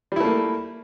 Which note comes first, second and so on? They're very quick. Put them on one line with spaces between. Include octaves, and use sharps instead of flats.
G3 E4 A3 A#3